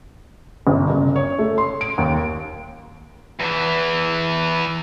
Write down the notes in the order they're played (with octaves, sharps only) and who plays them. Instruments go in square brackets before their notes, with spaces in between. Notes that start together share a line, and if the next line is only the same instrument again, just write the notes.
[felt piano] G1
F#1
C#5
A3
C6
D7
D#2
[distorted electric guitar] E2 E3